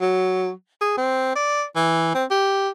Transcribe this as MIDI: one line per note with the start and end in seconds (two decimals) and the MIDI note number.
0.01 0.51 54
0.81 0.94 68
0.98 1.35 60
1.36 1.64 74
1.76 2.14 52
2.15 2.25 60
2.31 2.69 67